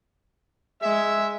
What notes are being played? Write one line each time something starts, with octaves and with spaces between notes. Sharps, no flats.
G#3 E5 E6